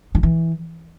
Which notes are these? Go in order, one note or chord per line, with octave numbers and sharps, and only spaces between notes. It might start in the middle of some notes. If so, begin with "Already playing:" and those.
D#3
E3